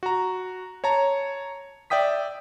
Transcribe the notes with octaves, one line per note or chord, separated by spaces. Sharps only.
F#4 A#5
C#5 A5 A#5
D5 E5 G5 D#6 B6